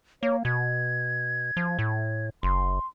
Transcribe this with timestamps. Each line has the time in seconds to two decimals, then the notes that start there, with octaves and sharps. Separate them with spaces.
0.23 A#3 C#5
0.45 B2 G#6
1.57 F3
1.79 A2
2.43 F#1 C6